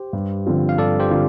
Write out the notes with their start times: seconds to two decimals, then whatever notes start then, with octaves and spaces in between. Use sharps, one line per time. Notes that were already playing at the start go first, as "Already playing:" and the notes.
Already playing: G4 C5
0.13 G2
0.46 D3 F3 C4 F4
0.69 F5
0.78 G2 A4 D5
0.99 G4 C5
1.11 D3 F3 C4 F4